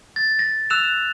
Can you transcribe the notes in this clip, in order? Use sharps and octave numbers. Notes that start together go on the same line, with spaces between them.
A6
A#6
E6 F#6 E7 F7